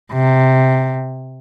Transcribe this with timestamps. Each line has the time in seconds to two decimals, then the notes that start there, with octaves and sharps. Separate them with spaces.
0.13 C3